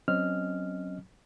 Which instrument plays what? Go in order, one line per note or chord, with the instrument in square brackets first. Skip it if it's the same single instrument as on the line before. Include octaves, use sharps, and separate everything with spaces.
[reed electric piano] F#3 C4 C#4 D#5 F6